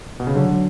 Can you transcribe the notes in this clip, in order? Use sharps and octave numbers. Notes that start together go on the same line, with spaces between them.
B2
C#3
D3 F#3
F#3